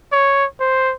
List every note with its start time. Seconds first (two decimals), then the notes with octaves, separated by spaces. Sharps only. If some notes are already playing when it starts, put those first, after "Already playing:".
0.12 C#5
0.60 C5